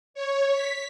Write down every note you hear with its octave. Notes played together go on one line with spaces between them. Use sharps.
C#5
B6